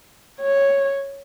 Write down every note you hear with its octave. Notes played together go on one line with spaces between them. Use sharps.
C#5